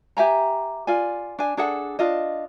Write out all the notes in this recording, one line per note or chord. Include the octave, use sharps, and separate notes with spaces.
G4 E5 G#5 A#5
F4 D5 G#5
D4 G#5
D4 G#4 A4 F#5
D4 F4 D#5